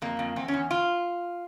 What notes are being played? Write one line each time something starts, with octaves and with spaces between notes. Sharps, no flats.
F2 A#3
F2
E2 C4
C#4
E2
F4